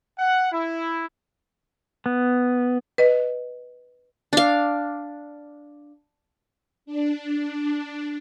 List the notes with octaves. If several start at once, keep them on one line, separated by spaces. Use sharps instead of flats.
F#5
E4
B3
B4 D#5
D4 F5
D4